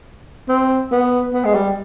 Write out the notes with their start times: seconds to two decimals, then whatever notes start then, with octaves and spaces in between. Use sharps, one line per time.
0.49 C4
0.92 B3
1.33 B3
1.45 G#3
1.55 G3